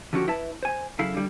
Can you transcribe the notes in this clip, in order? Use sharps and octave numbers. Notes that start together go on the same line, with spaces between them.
D3 F3 G3 C#4 F#4 G4
E4 B4 E5 A5
C5 G#5
F#2 C#3 E4 A4 F5
D3 G3